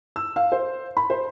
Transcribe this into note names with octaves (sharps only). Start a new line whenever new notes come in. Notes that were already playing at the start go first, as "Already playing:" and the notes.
E6
F5
C5
B5
C5